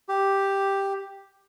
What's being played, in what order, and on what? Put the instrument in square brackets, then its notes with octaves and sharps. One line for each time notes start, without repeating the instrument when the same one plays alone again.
[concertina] G4